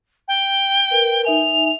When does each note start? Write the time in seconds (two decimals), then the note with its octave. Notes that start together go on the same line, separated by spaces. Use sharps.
0.28 G5
0.91 A#4 B4
1.25 D#4 E5 G#5 F7